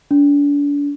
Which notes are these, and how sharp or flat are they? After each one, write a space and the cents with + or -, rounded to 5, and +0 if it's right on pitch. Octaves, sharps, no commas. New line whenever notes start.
D4 -35